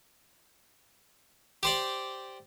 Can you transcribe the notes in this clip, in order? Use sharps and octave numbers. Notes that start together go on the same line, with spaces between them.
G4 C5 D5